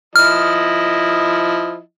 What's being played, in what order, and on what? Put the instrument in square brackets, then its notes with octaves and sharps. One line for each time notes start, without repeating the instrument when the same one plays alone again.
[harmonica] F3 E4 D#5 [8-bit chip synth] F6